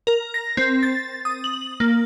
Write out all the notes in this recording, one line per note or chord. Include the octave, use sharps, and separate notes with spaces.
A#4
A#6
C4
A6
D#6
F#7
A#3